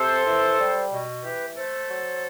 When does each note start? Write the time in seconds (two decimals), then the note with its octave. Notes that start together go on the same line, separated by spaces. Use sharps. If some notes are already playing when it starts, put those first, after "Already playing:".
Already playing: C3 A4 C5
0.26 E3
0.59 G3
0.91 B2
1.23 E3 G4 B4
1.56 A3 A4 C5
1.88 F#3